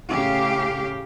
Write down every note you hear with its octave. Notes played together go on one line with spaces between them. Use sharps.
A2 C#3 G4 F5